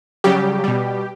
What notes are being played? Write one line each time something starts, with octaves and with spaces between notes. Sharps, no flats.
C#3 F#3 G3 G4
B2 G3